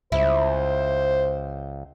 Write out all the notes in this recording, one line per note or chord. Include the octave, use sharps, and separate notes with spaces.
C#2 E4 C5